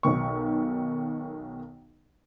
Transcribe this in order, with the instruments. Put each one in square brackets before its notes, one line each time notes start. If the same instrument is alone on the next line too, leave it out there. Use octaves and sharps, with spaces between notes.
[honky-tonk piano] B1 B2 D#3 C#6